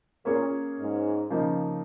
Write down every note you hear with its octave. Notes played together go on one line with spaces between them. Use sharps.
A#2 A#3 C#4 G#4 C#5
G#2
C#3 F3 A#3 D#4